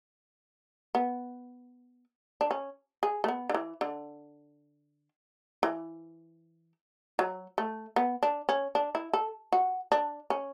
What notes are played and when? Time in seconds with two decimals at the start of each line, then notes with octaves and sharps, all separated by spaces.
0.95 B3
2.41 D4
2.51 C#4
3.03 G#4
3.24 A3
3.28 B3
3.49 D3
3.54 E3
3.81 D3
5.63 E3
7.19 F#3
7.58 A3
7.96 B3
8.23 D4
8.49 C#4
8.75 D4
8.95 E4
9.13 A4
9.52 F#4
9.92 D4
10.30 C#4